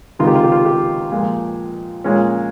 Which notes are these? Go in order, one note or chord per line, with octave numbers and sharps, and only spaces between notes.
C#2 C3 D#3 G#3 D#4 F4
G4
F4
G4
F4
G4
A#2 F3 G#3
A#2 G#3 C#4